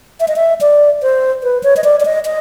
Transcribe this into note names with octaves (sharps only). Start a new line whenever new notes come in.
E5
D#5
E5
D5
C5
B4
C#5
D#5
D5
D5
D#5
D#5